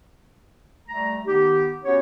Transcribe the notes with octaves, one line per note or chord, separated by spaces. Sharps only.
G3 A3 A#5
D#3 B3 D#4 G4
B3 C#4 F#4 G4 C#5